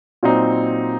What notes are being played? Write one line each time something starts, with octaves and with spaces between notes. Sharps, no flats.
A#2 F#3 C4 D#4